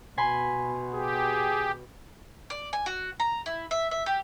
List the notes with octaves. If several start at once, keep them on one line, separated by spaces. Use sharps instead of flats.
B2 G#5 B5 C6
G4 G#4
D5
G#5
F#4
A#5
E4
E5
E5
G4